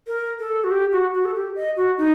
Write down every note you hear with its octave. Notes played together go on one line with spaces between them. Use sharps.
A#4
A4
F#4
G4
F#4
F#4
A4
G4
D#5
F#4
D#4